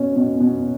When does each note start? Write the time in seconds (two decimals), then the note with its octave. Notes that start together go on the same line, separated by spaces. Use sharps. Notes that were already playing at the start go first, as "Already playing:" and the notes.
Already playing: B2 C#4
0.16 B2
0.40 B2